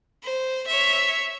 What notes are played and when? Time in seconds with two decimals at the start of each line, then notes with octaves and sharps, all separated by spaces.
0.23 C5
0.67 C#5 E5